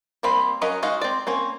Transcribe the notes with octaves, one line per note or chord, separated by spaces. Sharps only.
G3 A#3 C4 F5 B5
F#3 C#4 A#4 D#5 F5
G#3 D#4 F#4 D#5 F5
C4 D5
A#3 C4 C#4